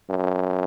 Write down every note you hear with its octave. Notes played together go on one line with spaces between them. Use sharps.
F#2